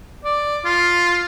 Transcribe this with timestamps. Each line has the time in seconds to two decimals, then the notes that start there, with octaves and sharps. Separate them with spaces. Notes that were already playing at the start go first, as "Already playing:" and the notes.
0.25 D5
0.65 F4